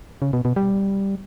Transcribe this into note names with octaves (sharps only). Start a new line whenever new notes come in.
C#3
B2
B2
G3